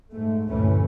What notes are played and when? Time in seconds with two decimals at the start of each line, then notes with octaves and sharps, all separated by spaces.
0.13 G#2 A3
0.48 D2 G2 A#2 E3 A3 C#4